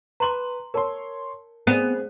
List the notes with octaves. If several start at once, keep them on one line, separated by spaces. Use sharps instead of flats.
B4 A#5 C6 D6 F#7
A#4 C#5 A5 C6
B3 C4 G#4